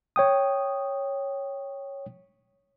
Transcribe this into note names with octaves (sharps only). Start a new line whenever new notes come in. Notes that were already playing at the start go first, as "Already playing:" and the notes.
C#5 G5 D#6